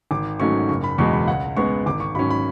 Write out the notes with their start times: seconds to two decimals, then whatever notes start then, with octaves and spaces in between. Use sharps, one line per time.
0.11 G#1 D6
0.40 G#2 F#3 A3 C#4 C#6
0.69 F#1 C#6
0.84 B5
0.98 E2 B2 G#3 C#6
1.13 B5
1.27 C#2 F#5
1.57 C#3 G#3 B3 C#6
1.86 G#1 D6
2.00 C#6
2.15 G#2 F#3 C#4 B5
2.30 B5